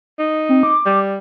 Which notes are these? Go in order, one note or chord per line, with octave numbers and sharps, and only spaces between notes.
D#4
C4
D6
G3